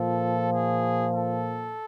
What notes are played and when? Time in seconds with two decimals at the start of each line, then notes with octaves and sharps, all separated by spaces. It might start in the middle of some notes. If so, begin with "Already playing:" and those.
Already playing: A#2 F3 A4
0.53 G#4
1.14 A4